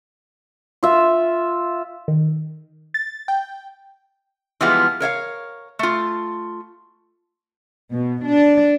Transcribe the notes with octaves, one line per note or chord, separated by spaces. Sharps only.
F4 E5
D#3
A6
G5
E3 F3 G3 G#3 B3 F4
A#4 C#5 E5 F5
A3 F4
B2
D4